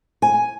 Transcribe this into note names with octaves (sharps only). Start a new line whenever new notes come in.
G#5